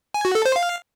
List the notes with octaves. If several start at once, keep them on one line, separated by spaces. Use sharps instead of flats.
G#5
F#4
A4
C5
F5